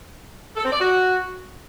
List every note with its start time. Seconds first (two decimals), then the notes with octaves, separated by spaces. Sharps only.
0.57 A4
0.64 C4
0.72 D5
0.80 F#4